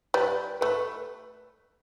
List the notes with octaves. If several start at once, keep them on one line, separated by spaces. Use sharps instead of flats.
G3 B4
A3 B4